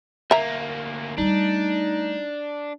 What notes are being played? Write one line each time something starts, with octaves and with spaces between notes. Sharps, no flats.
D2 A#3 E5 A#5
G3 A3 D4 D#4